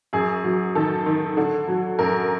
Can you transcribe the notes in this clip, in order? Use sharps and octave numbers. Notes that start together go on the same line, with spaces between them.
F#2 G#4
F#3
D#3 A4
D#3
D3
F#3
F#2 A#4